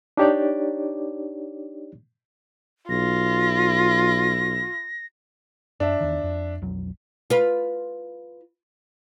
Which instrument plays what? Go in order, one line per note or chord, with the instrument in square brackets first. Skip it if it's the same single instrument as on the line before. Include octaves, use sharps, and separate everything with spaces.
[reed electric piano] D4 D#4 G4 C#5 D5
[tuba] B1 [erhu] F4 [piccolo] A#6
[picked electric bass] F#2 [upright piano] D4 E5
[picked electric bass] E2 D#3
F2
B1 F2 F#3
[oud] F4 B4